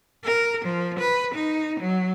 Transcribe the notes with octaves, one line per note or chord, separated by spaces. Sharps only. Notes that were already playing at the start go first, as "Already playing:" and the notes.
A#4
F3
B4
D#4
F#3